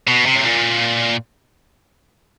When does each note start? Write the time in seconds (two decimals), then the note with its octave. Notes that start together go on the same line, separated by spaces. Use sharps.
0.07 B2
0.26 C3
0.35 A2
0.44 A#2